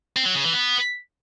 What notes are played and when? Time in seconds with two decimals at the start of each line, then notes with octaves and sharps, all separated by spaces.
0.16 C4
0.26 F#3
0.35 C#3
0.44 E3
0.53 B3